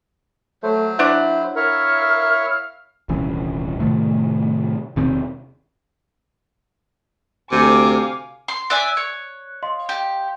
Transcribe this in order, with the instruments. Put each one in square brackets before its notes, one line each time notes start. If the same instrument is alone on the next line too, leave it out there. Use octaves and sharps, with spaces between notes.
[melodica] F#3 C5 [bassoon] A3
[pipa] D4 F#5 [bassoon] E4
[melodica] E4 C#5 E5 [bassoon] A#4 [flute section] F5 F6
[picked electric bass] D#1 C2 E3 C#4
A2 C3 D#3 A3
E1 C3 D#3 C4
[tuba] D2 [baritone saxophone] C3 [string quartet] F5 G#5 D6
[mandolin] C6
[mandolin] D5 E5 G#5 [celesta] F#6
[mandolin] C#5
[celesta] D#5 F5 C6
[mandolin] G4